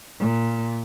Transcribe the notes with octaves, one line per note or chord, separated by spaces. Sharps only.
A#2